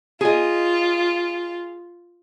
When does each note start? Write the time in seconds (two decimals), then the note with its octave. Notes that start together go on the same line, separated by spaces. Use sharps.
0.21 F4 G#4 D#5